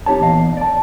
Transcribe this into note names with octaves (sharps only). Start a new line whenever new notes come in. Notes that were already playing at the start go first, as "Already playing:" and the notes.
C4 D#4 G4 C#5 A5
E2 A#2 D#5 F5
D5 A5